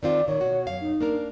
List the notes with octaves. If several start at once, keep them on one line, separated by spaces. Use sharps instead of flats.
D#3 C4 F4 D5
A#2 D#3 C#5
B2 F#4
F#2 F5
D#4
A#3 D4 A#4